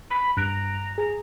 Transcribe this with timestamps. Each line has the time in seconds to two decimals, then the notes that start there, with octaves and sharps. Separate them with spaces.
0.10 B5
0.37 G2 A#5 F#6 D7
0.98 G#4 A#5